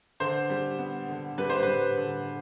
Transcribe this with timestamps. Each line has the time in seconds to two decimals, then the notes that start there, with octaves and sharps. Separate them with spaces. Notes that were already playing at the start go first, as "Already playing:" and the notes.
0.20 D3 C5
0.50 G3
0.78 B3
1.08 D3
1.38 G3 B4
1.50 C5
1.63 G3 B4
1.97 D3